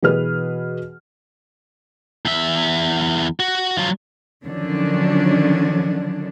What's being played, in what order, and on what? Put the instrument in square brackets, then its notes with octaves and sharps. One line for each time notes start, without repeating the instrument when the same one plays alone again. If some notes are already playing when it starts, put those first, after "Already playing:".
[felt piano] B2 E3 G#4 B4 F6
[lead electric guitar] E2 E5
F#4
F#3 F4
[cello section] D3 D#3 F3 F#3 C#4 D4